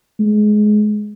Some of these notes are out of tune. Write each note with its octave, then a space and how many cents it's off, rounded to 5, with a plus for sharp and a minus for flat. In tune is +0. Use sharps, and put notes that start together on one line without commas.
G#3 +20